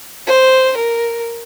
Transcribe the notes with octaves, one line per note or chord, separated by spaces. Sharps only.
C5
A#4